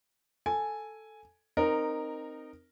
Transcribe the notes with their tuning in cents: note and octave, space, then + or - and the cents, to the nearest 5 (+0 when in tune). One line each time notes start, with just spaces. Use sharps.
A4 +0 G#5 +0
C4 +0 D#4 -15 A#4 +0